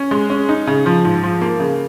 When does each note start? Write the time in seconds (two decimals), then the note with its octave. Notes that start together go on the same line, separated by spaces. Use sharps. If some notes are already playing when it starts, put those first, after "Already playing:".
Already playing: C#4
0.11 G#3
0.30 C#4
0.49 D#4
0.67 C#3
0.86 F3
1.05 G#2
1.23 F3
1.41 A#3
1.60 C#3